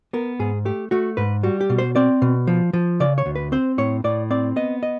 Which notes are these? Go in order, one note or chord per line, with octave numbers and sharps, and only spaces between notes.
B3 A#4
G#2 G#4
A3 G4
A3 F#4
G#2 B4
G3 F#4
G4
B2
C5
C4 D5
B2
F3
F3
C#3 D5
C#5
D2
B4
C4 C5
A2 C#5
A2 D5
C4 D5
B3 D#5
D#5